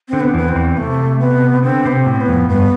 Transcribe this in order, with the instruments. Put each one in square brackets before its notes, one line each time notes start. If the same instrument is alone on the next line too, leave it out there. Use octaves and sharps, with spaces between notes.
[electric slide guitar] D3 [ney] C4
[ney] B3
[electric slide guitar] E2 E3 [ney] B3
[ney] C4
[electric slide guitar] E2 E3
[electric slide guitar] C3 [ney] A3
[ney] B3
[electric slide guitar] D3 [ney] C4
[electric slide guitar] C3 [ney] B3
[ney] C4
[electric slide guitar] A2
[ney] B3
[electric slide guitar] F2
[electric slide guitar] G2 [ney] B3